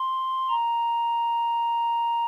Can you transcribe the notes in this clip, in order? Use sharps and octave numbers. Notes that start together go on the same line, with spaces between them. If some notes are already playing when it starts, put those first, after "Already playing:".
Already playing: C6
A#5